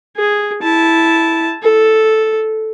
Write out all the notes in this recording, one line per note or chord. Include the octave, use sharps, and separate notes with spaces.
G#4
E4 A5
A4